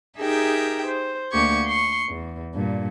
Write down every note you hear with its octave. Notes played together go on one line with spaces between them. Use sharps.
D#4 G4 G#4 A#4 E5 G5
C5
D2 A#3 G4 C#6 G#6
C6 C#6
E2
G2 A#2